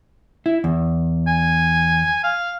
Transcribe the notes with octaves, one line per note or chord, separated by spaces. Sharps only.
E4
E2
G#5
F5